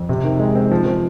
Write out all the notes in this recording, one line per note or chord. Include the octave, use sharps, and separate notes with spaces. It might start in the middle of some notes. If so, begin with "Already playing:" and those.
Already playing: F2
C3
D#3
G#3
C4
F3
F3